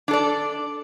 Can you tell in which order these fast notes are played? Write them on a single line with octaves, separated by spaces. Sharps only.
D4 A4 D5